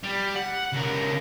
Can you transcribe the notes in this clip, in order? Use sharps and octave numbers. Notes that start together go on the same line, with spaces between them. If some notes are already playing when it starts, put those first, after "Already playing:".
G3
F#5
C#2 A#4